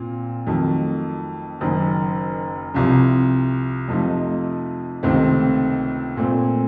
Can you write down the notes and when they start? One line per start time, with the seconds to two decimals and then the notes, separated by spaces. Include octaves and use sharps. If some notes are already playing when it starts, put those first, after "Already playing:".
Already playing: A#2 C4 F4
0.47 F2 D#3 F#3 A3
1.61 F#1 F#2 D#3
2.74 C2 C3 F3
3.88 F2 C3 F3 A3 D#4
5.03 C#2 C3 D#3 A3 C4
6.17 A#2 A3 C4